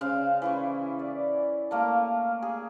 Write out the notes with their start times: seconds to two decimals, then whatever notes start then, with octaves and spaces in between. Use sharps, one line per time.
0.01 C#3 C5 F5
0.42 E3 E4 C#6
0.99 D5
1.71 A3 A#3 F5
2.42 G#4